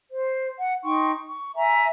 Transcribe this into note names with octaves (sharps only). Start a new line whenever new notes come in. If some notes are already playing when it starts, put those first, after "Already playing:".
C5
F#5
D#4 G5 C6 C#6
C#6
E5 G#5 A#5